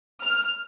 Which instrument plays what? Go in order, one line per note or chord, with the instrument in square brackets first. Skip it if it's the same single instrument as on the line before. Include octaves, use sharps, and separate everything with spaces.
[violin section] F6